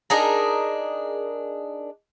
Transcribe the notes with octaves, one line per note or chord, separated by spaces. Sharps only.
D4 D#4 G#4 A#4